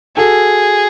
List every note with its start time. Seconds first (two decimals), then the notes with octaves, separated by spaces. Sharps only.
0.17 F#4 G#4 A4